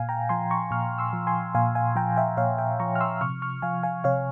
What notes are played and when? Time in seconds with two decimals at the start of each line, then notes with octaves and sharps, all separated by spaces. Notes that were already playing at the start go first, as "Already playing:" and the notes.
Already playing: A#2 F5 G#5
0.09 G5 A#5
0.29 F3 G#5 C6
0.51 A#5 C#6
0.71 A#2 C#6 F6
0.98 C6 E6
1.13 F3
1.27 G#5 C6
1.55 A#2 F5 G#5
1.75 F5 G#5
1.96 F3 G5 A#5
2.16 E5 G5
2.37 A#2 C#5 F5
2.58 E5 G5
2.79 F3 A#5 C#6
2.95 F6
3.01 C6 E6
3.21 C3 C#6 F6
3.42 C#6 F6
3.62 F3 F5 G#5
3.83 F5 G#5
4.04 C3 C#5 F5